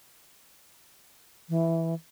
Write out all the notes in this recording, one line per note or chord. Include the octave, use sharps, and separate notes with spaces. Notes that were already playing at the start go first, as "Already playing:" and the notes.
E3